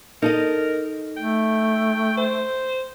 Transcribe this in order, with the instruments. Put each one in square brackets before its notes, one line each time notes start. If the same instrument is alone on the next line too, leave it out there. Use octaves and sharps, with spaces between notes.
[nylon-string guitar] D#4 A4 D#5 [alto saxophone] A#4
[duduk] A3 [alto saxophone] G5
[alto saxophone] C5